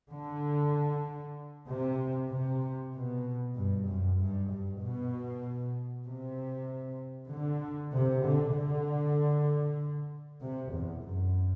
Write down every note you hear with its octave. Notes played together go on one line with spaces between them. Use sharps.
D3
C3
C3
B2
G2
F#2
G2
G2
B2
C3
D3
C3
D3
D3
C3
E2
F#2